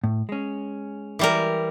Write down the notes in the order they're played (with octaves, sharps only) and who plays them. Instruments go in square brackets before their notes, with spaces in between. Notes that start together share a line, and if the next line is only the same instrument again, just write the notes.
[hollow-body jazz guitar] A2
G#3 C#4
[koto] E3 G3 A#4